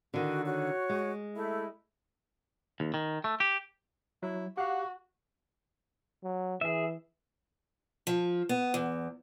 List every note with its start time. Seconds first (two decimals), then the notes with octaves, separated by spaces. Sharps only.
0.14 D3 D#3 F#4
0.46 F#4 C#5
0.89 G#3
1.36 A3 E4
2.80 D#2
2.94 D#3
3.24 A3
3.40 G4
4.23 F#3 E4
4.57 F#4 G4 F5 F#5
6.24 F#3
6.61 E3 G#4 E5
8.07 F3
8.49 B3
8.74 E2